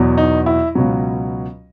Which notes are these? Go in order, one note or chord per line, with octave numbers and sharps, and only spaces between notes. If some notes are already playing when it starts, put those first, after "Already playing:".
Already playing: E2 B2 F#3
D#4
E4
C#2 B2 F#3